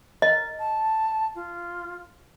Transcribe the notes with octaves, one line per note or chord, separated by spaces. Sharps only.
A#4 D#5
A5
F4